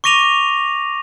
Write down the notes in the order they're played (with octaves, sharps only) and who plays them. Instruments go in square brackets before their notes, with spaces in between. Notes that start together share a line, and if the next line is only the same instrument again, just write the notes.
[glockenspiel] C#6 D6 A#6 D#7 F7 G7